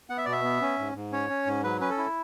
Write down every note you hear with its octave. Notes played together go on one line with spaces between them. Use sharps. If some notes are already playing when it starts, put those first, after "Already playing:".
B3 F#5
E5
B2 D5
E5
B3
C#4
G#2
G#2
C#4 C#5
C#4
G#2
F#3 B4
C#4 B4
A4
E4